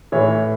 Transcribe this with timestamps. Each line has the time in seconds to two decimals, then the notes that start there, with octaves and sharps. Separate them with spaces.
0.12 A2 E3 C#5